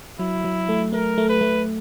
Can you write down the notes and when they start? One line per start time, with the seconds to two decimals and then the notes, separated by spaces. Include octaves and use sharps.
0.19 F#3 E4
0.44 F#3
0.69 A3
0.92 A3 A#4
1.18 A3
1.29 B4
1.41 A3